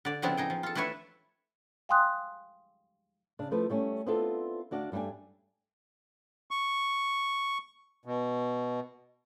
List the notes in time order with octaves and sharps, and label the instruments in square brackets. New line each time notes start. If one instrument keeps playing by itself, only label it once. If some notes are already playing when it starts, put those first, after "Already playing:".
[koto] D3 D5
C#3 F3 B3 C4 D4 E4
D#4 G#4 G5
F3
F4 A4
A3 D4 E4 B4 C#5 E5
[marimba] F5 G5 G#5 C6 D#6 F#6
[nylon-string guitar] C#3 D4
F3 A3 E4 B4
G3 A3 C#4
B3 C4 D4 E4 F4 A4
D2 D4 F#4 D5 F5
G2 G3 A3 D4 G#5
[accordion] C#6
B2